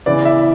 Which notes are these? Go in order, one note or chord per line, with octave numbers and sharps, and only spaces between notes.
C#3 E3 B3 D5
E5